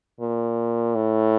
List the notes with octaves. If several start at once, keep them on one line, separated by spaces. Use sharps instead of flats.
A#2
A2